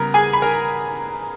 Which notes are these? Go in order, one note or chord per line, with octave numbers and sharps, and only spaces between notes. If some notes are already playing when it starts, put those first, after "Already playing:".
Already playing: C#3 G3 B3 A#4 A#5
G#4 G#5
B5
A#4 A#5